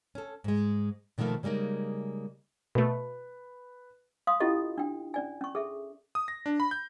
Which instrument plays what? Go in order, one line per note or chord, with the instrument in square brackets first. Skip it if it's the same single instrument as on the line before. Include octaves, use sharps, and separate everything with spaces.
[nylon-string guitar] C#4 A4
G#2 G#3
B2 D#3 F3 A3 A#3
C#3 G3 G#3 A#3 D#4
[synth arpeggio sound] B2 A3 [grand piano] B4
[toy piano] F5 C6 D#6
C#4 E4 F4 G4 A4 D#5
D4 G5
C#4 D5 G#5
C#4 C#6
G#4 A4 E5
[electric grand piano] D#6
A#6
D4
B5
G6